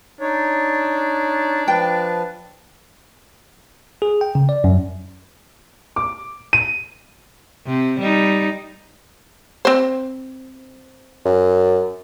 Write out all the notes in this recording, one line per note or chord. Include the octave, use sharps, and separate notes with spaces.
D4 D#4 C#5
F3 B4 G5 A5
G#4
G5
C#3
D5
F#2
D6
D#7
C3
G3 D#4
C4 C5
F#2